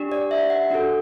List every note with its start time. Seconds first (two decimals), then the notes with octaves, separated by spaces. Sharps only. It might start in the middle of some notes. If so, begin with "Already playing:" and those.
Already playing: D4 G4
0.12 D5
0.31 E5
0.50 F#5
0.71 D4 F#4 A4